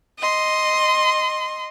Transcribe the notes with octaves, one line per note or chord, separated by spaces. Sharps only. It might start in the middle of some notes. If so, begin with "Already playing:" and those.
D#5 C6